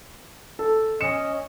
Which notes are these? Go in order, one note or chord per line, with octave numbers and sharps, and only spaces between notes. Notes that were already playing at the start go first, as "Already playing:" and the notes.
A4
C#4 D#5 C#7 E7